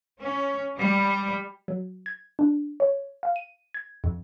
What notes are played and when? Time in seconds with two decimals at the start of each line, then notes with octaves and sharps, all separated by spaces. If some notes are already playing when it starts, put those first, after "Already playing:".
0.18 C#4
0.78 G3
1.68 F#3
2.06 G#6
2.39 D4
2.80 C#5
3.23 F5
3.36 D#7
3.74 G#6
4.04 F2